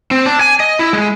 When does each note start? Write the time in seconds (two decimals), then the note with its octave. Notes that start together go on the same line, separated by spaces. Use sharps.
0.11 C4
0.26 D4
0.41 G#5
0.60 D#5
0.79 E4
0.93 G#3